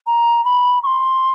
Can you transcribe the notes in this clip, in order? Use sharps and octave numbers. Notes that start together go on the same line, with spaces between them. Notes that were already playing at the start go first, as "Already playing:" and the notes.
A#5
B5
C#6
C6